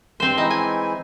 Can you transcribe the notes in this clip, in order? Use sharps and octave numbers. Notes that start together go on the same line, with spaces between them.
G2 C4 C5
E3 G#3 D#4 E4
G#5